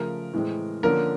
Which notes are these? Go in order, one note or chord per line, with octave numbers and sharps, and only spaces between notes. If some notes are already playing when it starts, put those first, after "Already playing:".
Already playing: C#3 F3 A3 A#4
A2 E3 G#3 C4
D3 F3 A#3 C#4 A#4